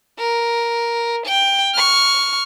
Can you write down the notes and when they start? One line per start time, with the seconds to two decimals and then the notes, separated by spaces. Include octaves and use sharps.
0.19 A#4
1.26 G5
1.74 C#6 F6